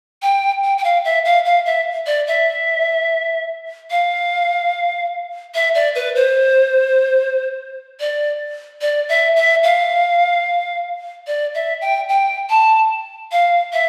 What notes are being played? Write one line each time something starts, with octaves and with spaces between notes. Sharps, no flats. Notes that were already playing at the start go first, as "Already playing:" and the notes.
G5
G5
G5
F5
E5
F5
F5
E5
D5
E5
F5
E5
D5
B4
C5
D5
D5
E5
E5
F5
D5
E5
G5
G5
A5
F5
E5